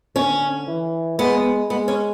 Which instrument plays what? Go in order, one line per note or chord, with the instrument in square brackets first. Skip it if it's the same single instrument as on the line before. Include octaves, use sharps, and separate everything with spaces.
[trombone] D3 [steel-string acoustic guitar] C#4
[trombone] E3
[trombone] G#3 [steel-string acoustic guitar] B3
[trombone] G#3 [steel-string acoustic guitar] B3
[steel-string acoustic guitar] C#4